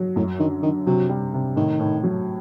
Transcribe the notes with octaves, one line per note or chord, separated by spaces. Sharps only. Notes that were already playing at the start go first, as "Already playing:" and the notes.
Already playing: F#3
F#2 A2
D3 D#3
D3 D#3
C3 F#3
G3
C3
A2 D#3
A2
F#3